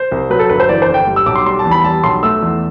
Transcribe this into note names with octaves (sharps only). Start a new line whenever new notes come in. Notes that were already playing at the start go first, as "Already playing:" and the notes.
Already playing: C5
C2
F#3 B4
A4
G1 B4
C5
E3 D5
C5
G1
G5
G3
E6
B1 D6
C6
G3 C6
A5
E2
B5
G3 A5
B1 C6
A3 E6
E2